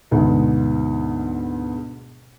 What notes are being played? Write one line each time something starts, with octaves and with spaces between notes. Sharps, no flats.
D2 G#2 B2 G#3